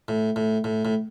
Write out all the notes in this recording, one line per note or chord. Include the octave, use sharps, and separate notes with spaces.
A2
A2
A2
A2